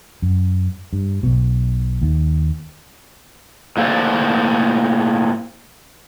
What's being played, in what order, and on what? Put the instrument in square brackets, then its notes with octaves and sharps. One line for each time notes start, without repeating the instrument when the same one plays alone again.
[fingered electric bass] F#2
G2
B1 B2
D#2
[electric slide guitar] A2 A#3 A4 C5 D5